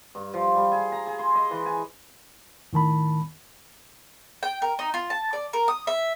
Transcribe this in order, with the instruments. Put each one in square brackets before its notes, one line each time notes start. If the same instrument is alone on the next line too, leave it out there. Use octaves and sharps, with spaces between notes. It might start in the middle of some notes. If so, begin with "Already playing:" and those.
[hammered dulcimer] G2
F3
G3
G#4
A#5
G#4
C6
D#5
E3
G#5
[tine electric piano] A2 D#3 A5 B5
[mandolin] G5
A#4
D#4
F4
A5
D5
A#4
D#6
E5